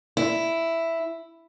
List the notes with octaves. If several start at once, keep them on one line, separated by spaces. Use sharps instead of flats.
E4